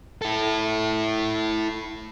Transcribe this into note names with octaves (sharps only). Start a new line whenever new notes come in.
E4 A4